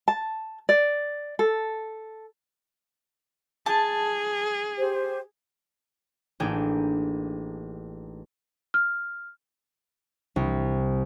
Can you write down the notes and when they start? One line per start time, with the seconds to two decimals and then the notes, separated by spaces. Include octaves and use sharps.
0.08 A5
0.69 D5
1.39 A4
3.66 G#4 A5
4.77 G4 C5
6.40 A1 A#3 D4 D#4 G#4 G5
8.74 F6
10.36 C2